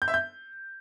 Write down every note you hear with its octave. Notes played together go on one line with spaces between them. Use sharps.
G6
E5
G6